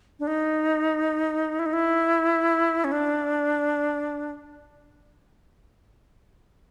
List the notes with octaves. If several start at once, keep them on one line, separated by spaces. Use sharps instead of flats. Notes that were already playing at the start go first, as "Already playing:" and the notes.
D4
D#4
E4
D#4
E4
C#4
D4